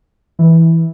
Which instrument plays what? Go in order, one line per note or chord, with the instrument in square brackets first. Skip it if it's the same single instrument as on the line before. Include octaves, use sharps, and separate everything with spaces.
[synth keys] E3